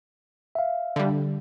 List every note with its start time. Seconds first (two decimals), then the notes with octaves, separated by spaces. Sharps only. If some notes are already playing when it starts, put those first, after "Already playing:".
0.55 E5 F5
0.96 D3 G3